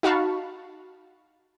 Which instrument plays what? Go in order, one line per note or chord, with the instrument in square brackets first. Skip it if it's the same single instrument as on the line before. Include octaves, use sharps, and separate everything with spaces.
[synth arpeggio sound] D#4 F#4 F5 A5 B5 C#6